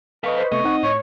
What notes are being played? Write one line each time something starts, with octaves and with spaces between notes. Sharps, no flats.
A4 B4 D#5 F5 C#6 B6
C5
C3 A3 B3 D#5 C#6
C4 D#4 F#5
A2 C#5 C#6